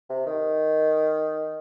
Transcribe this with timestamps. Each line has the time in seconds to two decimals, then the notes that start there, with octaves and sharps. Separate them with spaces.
0.10 C3
0.26 D#3